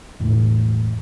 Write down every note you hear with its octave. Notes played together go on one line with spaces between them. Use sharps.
E1 A2 E3